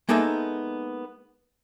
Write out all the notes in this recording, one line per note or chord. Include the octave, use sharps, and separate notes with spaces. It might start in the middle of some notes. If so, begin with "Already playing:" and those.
G#3 A#3 B3 D#4 A4 E5